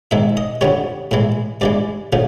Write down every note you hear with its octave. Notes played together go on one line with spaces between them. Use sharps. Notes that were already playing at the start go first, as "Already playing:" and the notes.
G#2 D#3 G#3 E5
D#5
F2 D3 G3 C#5
A2 E3 G#3
G2 E3 G#3 D5
C#3 F3 A3